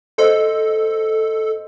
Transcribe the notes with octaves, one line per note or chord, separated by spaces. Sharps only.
A4 C5 D#5